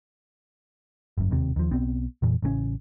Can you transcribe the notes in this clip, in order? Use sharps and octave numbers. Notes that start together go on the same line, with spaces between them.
G1 F#2
E1 D#2 C3
D#2 F3
B1 B3 C4
F2 A#2 E3
A1 C#3 G#3 C#4